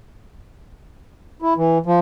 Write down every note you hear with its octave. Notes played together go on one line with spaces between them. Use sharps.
E4
E3
F3